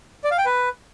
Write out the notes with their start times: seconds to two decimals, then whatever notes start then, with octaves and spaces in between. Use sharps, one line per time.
0.24 D5
0.31 F5
0.38 G5
0.45 B4